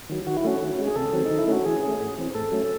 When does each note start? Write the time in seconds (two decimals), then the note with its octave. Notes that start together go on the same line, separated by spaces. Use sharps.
0.09 D#3 F#3
0.26 D#3 F#4
0.37 E4
0.44 A3 C#4 F#4
0.62 D#3
0.78 G#3 C#4
0.87 G#4
0.96 C3 A4
1.13 D#3 F#3 C4
1.26 D#4
1.31 D#3
1.38 E4
1.48 A3 C#4 F#4
1.65 E3 G#4
1.83 A3 C#4
2.00 A2
2.18 E3 C4
2.35 A2 A4
2.52 F#3 A3 C#4